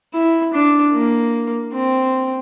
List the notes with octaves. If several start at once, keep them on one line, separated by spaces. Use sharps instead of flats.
E4
D4
A#3
C4